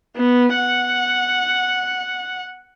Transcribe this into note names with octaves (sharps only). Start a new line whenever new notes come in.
B3
F#5